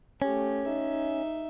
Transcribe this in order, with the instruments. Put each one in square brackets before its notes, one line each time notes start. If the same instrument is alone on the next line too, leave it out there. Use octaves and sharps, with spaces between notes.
[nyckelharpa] A3 G4 [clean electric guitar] C#4
[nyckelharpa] D#4 E5